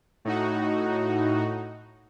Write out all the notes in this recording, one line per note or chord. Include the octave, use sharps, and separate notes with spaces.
A2 D#4 F#4